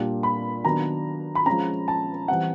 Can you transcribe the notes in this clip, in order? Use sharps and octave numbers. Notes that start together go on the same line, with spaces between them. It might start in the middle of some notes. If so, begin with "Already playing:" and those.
Already playing: A#2 G3 A#3 D4
B5
D#3 F#3 B3 D4 A#5
B5
F3 G#3 C#4 A#5
A5
E3 G3 C4 F#5